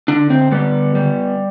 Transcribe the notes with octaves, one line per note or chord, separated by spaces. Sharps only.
D3 D4
C4
G3 B3
G3